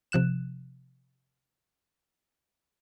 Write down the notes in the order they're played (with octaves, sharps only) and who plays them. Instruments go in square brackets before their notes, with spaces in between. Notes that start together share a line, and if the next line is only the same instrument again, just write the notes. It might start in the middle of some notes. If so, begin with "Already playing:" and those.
[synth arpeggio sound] C3 F3 F#6 E7